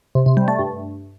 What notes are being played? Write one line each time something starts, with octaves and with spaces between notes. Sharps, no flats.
C3
C3
G3
A3
G2